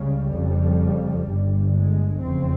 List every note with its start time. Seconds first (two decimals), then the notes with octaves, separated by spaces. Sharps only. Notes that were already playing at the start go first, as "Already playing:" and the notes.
Already playing: C#2 C#3 G3
0.31 F1 F2 C#3
1.27 G1 G2
1.75 G#3
2.22 F1 E2 C#3 C4